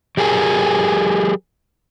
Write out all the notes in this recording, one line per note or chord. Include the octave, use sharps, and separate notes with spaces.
F#3 G4 G#4 A#4